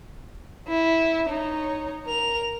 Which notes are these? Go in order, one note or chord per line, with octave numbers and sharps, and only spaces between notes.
E4
D#4 C#5
A#4 F7